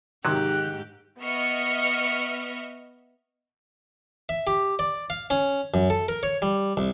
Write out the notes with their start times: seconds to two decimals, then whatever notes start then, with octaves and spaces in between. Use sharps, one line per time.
0.25 G#2 C3 D#3 F#3 G4 F#6
1.20 B3 D#5 E5 C#6 F6 C#7
4.29 E5
4.47 G4
4.79 D5
5.10 F5
5.30 C#4
5.74 F#2
5.90 A4
6.09 A#4
6.23 C#5
6.42 G3
6.77 C2